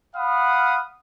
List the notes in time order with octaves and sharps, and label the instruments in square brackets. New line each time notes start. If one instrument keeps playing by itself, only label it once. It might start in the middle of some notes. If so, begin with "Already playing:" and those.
[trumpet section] F5 F#5 B5 D#6